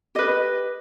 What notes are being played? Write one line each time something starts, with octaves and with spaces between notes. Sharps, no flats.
G4 B4 D#5